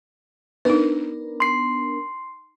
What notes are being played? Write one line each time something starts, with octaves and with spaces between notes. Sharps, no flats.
B3 D4 D#4 A#4 B4
C6 C7